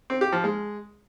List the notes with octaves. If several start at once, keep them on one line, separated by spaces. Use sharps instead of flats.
C4
G4
F3
G#3